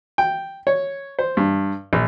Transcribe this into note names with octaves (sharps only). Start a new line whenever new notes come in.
G5
C#5
C5
G2
A#1